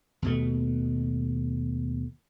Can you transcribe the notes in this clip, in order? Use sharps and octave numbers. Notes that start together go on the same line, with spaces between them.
D#2 B2 A3